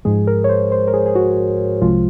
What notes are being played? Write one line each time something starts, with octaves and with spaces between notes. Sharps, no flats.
G#2 F3 G#3 G#4
A#4
C#5
C5
C5
A#4
G#4
G#4
F#4
C2 C3 F3 G#3 F4